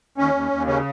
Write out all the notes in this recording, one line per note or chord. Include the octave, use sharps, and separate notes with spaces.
D#2 C#4
D#2
D#2
C#3 C#4